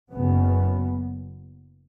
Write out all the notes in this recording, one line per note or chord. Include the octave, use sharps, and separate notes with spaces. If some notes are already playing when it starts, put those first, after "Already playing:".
F#1 F#2 C#3 B3